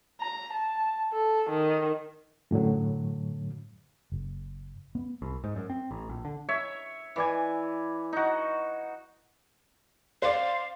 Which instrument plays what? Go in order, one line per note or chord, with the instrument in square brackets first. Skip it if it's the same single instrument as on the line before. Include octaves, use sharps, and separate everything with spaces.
[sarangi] A#5
A5
A4
D#3
[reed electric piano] F#2 A2 D3 F#3
[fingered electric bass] F#1
B3
[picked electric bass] C2
G#2
F#2
C4
A1
A#1
D3
[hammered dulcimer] C#5 E5
E3 D5 G#5
D#4 F#4
[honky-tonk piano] C5 D5 [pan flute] F5